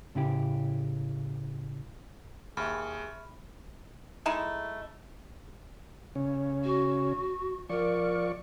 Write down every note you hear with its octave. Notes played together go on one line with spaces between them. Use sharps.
A2 C#3 E4 G4
D#2 G#4 E5 B5 C#6 F6
G#3 A3 D#4 E4
C#3 C#4
F#4
F3 A#4 D5 C#6